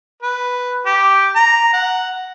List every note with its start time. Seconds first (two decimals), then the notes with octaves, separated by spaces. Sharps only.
0.22 B4
0.86 G4
1.36 A#5
1.73 F#5